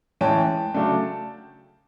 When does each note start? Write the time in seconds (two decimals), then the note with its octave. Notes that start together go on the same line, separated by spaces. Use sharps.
0.21 A2 E3 G#3 C#4 G5 A5
0.74 C#3 F#3 A3 D4